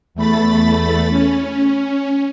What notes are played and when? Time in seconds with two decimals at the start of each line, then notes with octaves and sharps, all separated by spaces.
0.15 E2 A3 B5 A6
1.10 C#4